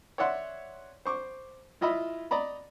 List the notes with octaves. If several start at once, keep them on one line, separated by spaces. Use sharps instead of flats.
C#5 D5 E5 F#5 C6
C5 C#6 D6
E4 F4 D#5 E5 B5
D5 D#5 A#5 B5